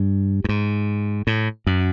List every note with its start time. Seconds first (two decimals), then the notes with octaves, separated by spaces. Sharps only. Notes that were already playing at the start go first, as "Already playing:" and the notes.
Already playing: G2
0.44 G2
0.49 G#2
1.27 A2
1.67 F#2